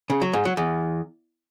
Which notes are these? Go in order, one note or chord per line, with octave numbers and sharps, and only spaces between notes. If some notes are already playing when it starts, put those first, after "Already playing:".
C#3
F#3
G#2
F#3
E2